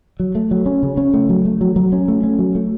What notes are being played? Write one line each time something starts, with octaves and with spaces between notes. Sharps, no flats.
F#3
A3
F#3
C#4
C#3
C#4
A3
F#3
A3
F#3
F#3
C#4
A3
C#4
F#3
A3